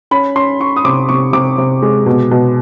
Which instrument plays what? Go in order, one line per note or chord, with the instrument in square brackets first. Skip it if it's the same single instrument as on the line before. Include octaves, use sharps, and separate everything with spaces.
[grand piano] C#4 B5
C#4 C6
C#4 C#6
D#6
C3 D6
C3 C#6
C3 D6
C3
G#3
B2
B2